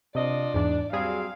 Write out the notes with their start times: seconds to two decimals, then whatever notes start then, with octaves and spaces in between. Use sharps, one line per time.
0.15 C3 D4 F4 D5 D#5
0.54 E2 G#2 D4
0.93 F#3 G3 C4 G#4 F5